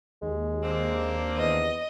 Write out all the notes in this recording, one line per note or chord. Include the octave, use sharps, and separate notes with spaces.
D#2 G#3
A#3 C4 D4
E2 D#5